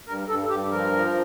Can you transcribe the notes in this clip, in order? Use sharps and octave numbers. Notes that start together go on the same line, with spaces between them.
G2 A#4
G2 A4
G2 G4
F3 A#4
F3